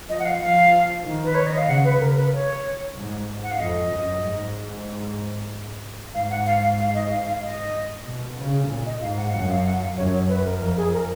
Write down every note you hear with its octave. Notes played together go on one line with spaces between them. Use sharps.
F3 D#5
F#5
F5
F3 F5
D#3
B4
C#5
D#5
F5
C#3 F#5
B4
C#3 A#4
B4
C#5
G#2
F#5
F5
F2 D#5
F#2
G#2
G#2 F5
F#5
F5
F5
F5
D#5
F5
F5
D#5
B2
C#3
A#2
D#5
G#2 F5
F#5
F5
F#2 F#5
F5
F#5
F5
F#2 C#5
C#5
B4
A#4
F2 A#4
G#4
A#4